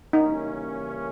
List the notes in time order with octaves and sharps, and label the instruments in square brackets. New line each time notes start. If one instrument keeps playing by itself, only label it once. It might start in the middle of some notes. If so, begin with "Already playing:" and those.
[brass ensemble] C#3 E3 G3 A#3 C#4 [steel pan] D#4